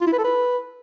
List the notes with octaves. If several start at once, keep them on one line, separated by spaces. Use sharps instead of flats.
F4
E4
B4
A4
B4